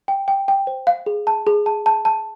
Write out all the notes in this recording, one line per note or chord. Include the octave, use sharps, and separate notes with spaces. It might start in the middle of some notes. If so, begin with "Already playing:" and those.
G5
G5
G5
C5
F5
G#4
A5
G#4
A5
A5
A5